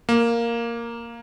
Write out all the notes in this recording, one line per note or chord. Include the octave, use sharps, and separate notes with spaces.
A#3